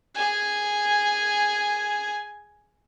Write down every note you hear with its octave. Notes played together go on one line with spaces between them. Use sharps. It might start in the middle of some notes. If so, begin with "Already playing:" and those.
G#4 G#5